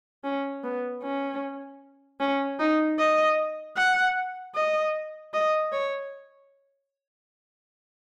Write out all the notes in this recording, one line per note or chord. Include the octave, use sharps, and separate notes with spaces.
C#4
B3
C#4
C#4
D#4
D#5
F#5
D#5
D#5
C#5